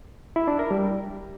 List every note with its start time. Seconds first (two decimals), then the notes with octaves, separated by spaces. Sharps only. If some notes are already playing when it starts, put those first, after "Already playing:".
0.36 E4
0.48 D4
0.59 A#4
0.71 G3